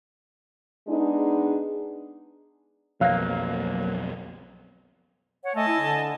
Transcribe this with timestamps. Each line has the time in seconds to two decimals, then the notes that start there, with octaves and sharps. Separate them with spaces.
0.88 G#3 B3 D4 D#4 G#4
3.01 B1 F2 F#3 A#3 F5
5.43 C#5 F#5
5.55 A3 D#5 G#5 A5
5.68 E4
5.80 D3